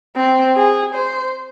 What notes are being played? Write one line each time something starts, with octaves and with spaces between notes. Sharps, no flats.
C4
G#4
C5